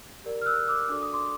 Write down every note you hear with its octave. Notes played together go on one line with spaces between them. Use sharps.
G4 A#4 D5
F6
E6 F#6
D6 E6
D4 F#4 A4 D5 D6
D#6
C6 D6